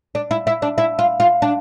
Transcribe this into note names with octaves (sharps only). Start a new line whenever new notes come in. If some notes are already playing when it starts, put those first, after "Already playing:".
D4
E4
E4
D4
E4
F4
F4
D4